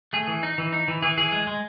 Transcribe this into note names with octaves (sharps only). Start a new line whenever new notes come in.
A3 G#4
E3
D#4
E3
D#4
E3
E3 G#4
E3 G#4
G#3
G#3